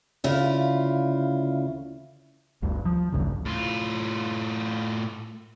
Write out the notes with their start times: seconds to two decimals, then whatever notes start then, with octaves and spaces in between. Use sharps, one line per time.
0.24 D2 C#3 E4 F4
2.62 G1 D2 G2
2.85 F3
3.12 A1 D2 G2 C#3
3.45 A2 F4